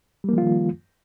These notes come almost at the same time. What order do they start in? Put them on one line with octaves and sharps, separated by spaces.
G3 A#3 F3 F4 D#3